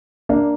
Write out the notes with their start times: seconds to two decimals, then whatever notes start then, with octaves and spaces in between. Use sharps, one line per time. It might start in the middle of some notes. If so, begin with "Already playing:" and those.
0.29 A#3 D4